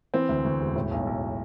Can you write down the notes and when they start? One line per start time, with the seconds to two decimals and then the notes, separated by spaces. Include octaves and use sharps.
0.14 E3 C4
0.29 D2
0.45 D2
0.61 E1
0.76 A2
0.91 B1
1.07 B1